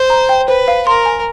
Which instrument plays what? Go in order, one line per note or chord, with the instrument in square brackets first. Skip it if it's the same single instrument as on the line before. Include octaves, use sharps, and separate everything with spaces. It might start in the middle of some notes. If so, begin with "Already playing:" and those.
Already playing: [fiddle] C5
[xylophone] A#5
G5
[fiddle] B4 [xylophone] C5
[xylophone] F5
[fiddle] A#4 [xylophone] C6
[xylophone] G#5